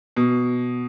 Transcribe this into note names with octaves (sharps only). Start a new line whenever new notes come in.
B2